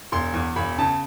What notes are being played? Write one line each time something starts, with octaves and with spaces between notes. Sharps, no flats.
E1 C6
E2
E1 B5
C#3 A5